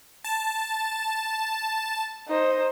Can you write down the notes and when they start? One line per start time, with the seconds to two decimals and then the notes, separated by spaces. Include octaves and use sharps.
0.24 A5
2.28 D#4 C5